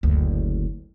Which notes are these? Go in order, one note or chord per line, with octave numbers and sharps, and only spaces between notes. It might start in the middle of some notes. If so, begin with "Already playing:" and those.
F#1 D2